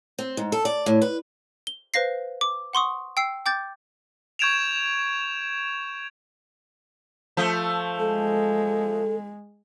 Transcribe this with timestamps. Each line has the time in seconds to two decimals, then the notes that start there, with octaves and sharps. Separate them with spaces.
0.19 C4
0.37 G#2
0.52 A4
0.65 D5
0.86 A2
1.02 B4
1.67 G7
1.94 B4 C5 F5 A#6 C7
2.41 D6
2.73 F#5 C6 C#6 D#6
3.17 G5 E6 C7
3.46 G5 D6 G6 A6
4.39 C#6 G6 G#6 D7 E7 F7
7.37 F3 A3
7.99 G#3 A4